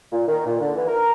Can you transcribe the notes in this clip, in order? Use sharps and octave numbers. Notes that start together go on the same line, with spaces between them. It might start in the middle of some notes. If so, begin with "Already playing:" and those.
A#2
D#3
A#2
D3
E3
A#4